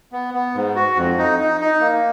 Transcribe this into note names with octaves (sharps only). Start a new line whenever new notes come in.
B3
B3
G#2
F#4
F2
D#4
D#4
D#4
A#3